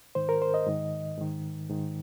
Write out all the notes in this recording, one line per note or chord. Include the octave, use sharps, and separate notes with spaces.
G#2 D#3 C5
A#4
C5
D#5
G#2 D#3
G#2 D#3
G#2 D#3